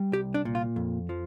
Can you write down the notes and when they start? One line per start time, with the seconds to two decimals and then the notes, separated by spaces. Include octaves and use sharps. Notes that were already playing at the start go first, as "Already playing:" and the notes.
Already playing: G3
0.12 C2 G4
0.34 D4
0.45 A#2
0.55 F4
0.76 F2
1.09 F3